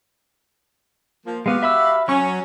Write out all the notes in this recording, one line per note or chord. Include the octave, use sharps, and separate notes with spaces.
F3 A#3
G#3 B3 F#4 G4 F5
E5 B5 E6
F#3 C#4 C#6